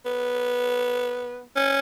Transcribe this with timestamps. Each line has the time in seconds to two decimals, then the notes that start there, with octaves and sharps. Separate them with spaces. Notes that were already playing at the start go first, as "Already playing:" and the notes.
0.05 B3
1.56 C#4